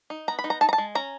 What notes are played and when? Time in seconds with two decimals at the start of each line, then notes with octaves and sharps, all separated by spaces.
0.10 D#4
0.28 B3 A#5
0.39 B5
0.44 D#4
0.50 A#5
0.61 D#4 A5
0.69 A#5
0.73 A5
0.78 G#3
0.95 C#4 A#5